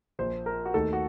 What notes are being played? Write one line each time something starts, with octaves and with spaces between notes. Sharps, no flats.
A#1 A#2 F3 C5
A#4
F#4
D#2 D#3 A3 D#4 A4
F#4